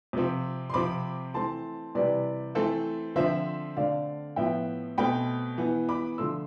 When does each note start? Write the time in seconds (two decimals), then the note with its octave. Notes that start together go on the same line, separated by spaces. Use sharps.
0.13 C3 F3 C4
0.70 C6
0.74 C3 F3 C4 B5 D6
1.34 E3 A3 C4 A5 C6
1.95 C3 E3 G3 B4 D5
2.55 E3 A3 C4 A4 C5
3.15 D3 F3 C4 C5 E5
3.77 D3 A3 C4 D5 F5
4.36 A2 F3 B3 E5 G5
4.98 B2 A3 C4 G5 B5
5.58 E3 B3
5.89 B5 D6
6.18 D3 F3 A3 C6 E6